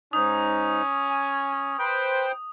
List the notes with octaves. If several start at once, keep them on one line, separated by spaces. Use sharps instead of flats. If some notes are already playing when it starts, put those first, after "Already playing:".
G#2 C#4 D#4 D#6
G#5
B4 C5 G5 G6